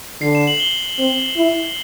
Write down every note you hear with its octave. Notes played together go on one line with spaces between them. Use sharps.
D3 C7
E7
F#7
G7
C4
E4